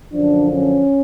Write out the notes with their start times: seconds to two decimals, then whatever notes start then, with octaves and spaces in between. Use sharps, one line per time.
0.13 F#2 D3 F3 D4
0.50 C#4